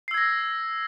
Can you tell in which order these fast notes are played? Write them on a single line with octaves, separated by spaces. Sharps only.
C7 E6 G#6 A#6